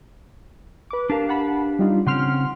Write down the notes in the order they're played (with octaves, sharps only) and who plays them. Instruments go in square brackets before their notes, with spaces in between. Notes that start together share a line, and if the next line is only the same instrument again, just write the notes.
[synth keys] B4 D6
[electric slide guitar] D4 G4 F5 [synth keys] A#4 A5
[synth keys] F#5 A5 B5
G3 D#4 F4
[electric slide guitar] C#3 C4 C#4 [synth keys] F#5 C6 F6